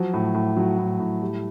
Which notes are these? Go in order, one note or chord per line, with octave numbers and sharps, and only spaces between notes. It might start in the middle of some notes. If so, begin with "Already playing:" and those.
Already playing: F3 F#3
A2
A2
F#3
A2
A2
G3